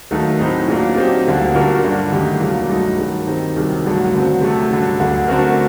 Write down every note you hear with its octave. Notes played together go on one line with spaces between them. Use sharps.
D#2 D#3 F#3 A3 D#4
A2 F#3 C4 D#4
A#2 F#3 A#3 D4
F#3 C4 D#4 G4
D2 D3 G3 A#3
A#2 G3 D4 F#4 A#4
G2 D3 F#3
D#2 D3 A3 D#4 G4
C2 A#2 F#3 A#3
G2 F#3 A3 D#4
G2 D#3 F#3
D#3 G3 C4 D#4
C2 C3 D#3 F#3
G2 D3 F#3 A3
D#2 D3 F#3 C4
C3 F#3 A3
G2 D3 F#3
D2 D3 F#3
D3 A3 C4 F#4 A#4